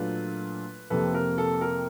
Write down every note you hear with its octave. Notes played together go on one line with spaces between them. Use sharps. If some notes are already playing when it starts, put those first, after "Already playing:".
Already playing: A#2 F#3 A3 D4 F4 B4
F2 C3 F3 A#3 A4 B4
A#4
A4
A#4